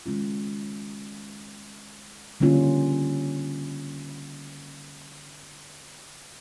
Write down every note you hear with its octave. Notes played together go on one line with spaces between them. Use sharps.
D#3 G#3 C#4 F4
D3 G3 A#3 C#4 F4